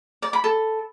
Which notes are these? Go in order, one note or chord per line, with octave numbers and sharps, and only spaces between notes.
D5
B5
A4